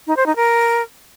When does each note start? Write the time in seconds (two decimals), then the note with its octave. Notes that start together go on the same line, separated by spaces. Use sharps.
0.07 D#4
0.17 C5
0.26 D#4
0.36 A#4